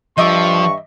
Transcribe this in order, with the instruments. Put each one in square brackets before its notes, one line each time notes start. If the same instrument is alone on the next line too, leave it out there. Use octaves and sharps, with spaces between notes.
[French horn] G2 [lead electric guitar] F3 [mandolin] D#5 E5 D6 [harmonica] C#6